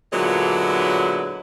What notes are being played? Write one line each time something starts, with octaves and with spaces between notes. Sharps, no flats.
A#2 D3 F#3 G#3 B3 E4